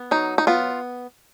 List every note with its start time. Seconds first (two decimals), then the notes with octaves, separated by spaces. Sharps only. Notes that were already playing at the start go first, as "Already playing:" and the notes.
Already playing: B3
0.11 F#3 D#4
0.38 D#4
0.47 B3 F4